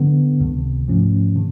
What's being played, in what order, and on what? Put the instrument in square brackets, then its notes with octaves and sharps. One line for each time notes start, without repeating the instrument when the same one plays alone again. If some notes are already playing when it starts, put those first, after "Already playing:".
Already playing: [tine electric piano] D3 F#3 B3
C#2 C3 D#3
G#2 F3 A3 C#4
C3 D#3